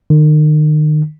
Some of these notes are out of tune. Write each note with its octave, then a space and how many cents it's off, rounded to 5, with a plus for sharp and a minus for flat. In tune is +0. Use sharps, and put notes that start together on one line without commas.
D#3 -35